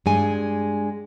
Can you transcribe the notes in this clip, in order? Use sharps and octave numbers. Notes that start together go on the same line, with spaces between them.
G2 G#3 G#5